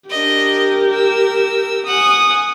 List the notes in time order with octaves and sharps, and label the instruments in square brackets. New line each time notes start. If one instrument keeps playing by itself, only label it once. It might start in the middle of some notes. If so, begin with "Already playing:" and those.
[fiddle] D4 D#5 [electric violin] G4 A#4
[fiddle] E6
[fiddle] F#5 G#5 [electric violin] D#6